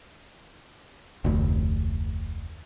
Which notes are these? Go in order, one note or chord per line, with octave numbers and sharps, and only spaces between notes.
F1 D2